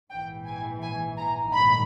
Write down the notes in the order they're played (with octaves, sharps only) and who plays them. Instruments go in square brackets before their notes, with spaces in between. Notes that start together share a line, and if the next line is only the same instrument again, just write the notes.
[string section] A#1 G#2 E3 G5
G#5
G#5
A#5
A#1 G#2 D#3 G3 B5